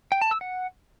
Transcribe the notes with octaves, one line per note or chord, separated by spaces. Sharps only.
G5
A5
E6
F#5